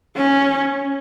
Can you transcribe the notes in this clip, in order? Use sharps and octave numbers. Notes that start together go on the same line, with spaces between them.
C#4